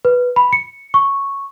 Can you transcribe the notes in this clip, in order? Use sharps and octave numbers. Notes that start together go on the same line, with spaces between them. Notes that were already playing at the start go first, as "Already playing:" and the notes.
B4
B5
C#7
C#6